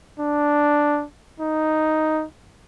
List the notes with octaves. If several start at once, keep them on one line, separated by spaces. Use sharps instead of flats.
D4
D#4